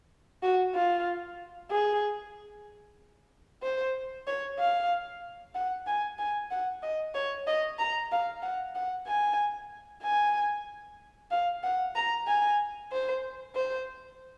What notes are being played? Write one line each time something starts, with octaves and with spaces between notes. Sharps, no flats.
F#4
F4
G#4
C5
C#5
F5
F#5
G#5
G#5
F#5
D#5
C#5
D#5
A#5
F5
F#5
F#5
G#5
G#5
F5
F#5
A#5
G#5
C5
C5